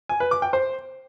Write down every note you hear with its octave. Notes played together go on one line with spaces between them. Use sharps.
G#5
B4
D6
G5
C5